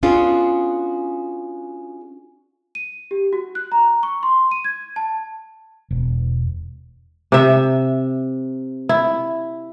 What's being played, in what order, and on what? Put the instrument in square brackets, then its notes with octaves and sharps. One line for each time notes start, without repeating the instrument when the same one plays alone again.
[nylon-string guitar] B3 C#4 D4 F4 F#4 G#4
[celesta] D#7
G4
F#4
F#6
A#5
C#6
C6
D#7
G#6
A5
[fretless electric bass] E1
[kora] C3 E5
E4